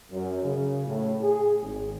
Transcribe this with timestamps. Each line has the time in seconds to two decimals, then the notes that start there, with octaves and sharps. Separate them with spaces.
0.11 F#2
0.44 C#3
0.87 A2
1.22 G#4
1.62 G#1